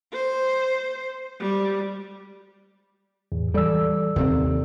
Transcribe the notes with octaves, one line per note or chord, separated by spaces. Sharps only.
C5
G3
E2 A2
E3 G3 A4 D5 E6
D#2 C3 C4